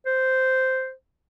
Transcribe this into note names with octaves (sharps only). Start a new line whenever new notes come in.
C5